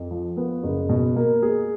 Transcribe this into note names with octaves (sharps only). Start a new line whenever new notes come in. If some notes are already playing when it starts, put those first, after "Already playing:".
Already playing: F2
F3
B3
F#1
B2
A#3
G#4